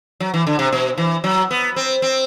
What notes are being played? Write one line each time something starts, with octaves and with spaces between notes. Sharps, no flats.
F#3
E3
D3
C3
B2
E3
F#3
B3
C4
C4